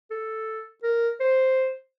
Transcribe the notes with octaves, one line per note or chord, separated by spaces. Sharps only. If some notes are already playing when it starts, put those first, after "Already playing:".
A4
A#4
C5